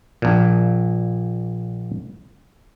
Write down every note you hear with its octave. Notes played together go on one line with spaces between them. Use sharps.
A#1 A#2